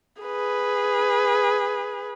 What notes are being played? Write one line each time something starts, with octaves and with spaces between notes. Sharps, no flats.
G#4 B4